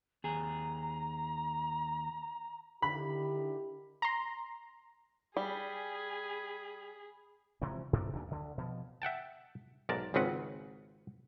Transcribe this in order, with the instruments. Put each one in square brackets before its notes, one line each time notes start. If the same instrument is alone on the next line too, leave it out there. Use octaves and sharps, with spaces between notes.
[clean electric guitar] D#2 G#4 [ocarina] A#5
[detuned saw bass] D3 [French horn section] D#3 E4 G4 [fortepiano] B5
[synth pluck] A#5 C6
[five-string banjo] G3 [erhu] G#4 [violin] G#5 B5
[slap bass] C3 E3 F3 G#3
G2 C3 E3 D4
D1 D2 A#2 D4
D2 D3
B2 F3
[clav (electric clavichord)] E5 F#5 G5 A5
B1 G#2 A#4 D5 A5
G#1 C#2 C#3 C4 B4 F#5